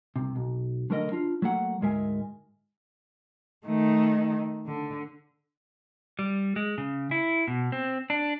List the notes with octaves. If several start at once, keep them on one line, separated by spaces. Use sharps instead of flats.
C2 C3
B1
D3 F#3 A3 A#4 C5 D#5
D4 F4
F#3 A3 A#3 F#5
D2 G#2 G#3 A#4 E5 G#5
D#3 A3
D3
G3
G#3
C#3
E4
B2
C4
D4